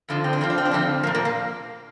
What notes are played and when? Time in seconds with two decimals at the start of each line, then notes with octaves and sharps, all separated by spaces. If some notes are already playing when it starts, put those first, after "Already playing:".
0.09 F2 D3 F3
0.24 C4
0.33 D4
0.41 F2 D3 F3 C4
0.50 D4
0.58 C4
0.65 D4
0.71 F2 D3 F3 C4
1.03 F3 A#3
1.07 A#2
1.15 A#3
1.25 A#3